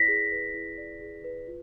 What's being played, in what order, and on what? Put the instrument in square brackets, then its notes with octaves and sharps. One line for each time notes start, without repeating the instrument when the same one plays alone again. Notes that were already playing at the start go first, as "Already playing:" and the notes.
Already playing: [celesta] E4 B4 D5 A#6 B6
G#4
B4
E4
D5
G#4
B4
F4